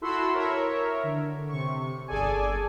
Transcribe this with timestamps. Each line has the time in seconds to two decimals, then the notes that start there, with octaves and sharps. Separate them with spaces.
0.01 E4 F#4 A4 B5 C6 E6
0.33 A#4 C#5 E5
1.03 D3
1.49 C3 C#6
2.08 G1 G#4 A4 D5 G#5